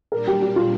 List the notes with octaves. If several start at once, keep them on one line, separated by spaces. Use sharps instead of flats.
A#2 G3 A#3 D4 A#4
G4
G4
F4